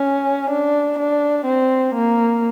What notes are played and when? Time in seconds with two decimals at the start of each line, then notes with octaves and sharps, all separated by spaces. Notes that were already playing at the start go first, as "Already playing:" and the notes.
Already playing: C#4
0.50 D4
0.98 D4
1.45 C4
1.94 A#3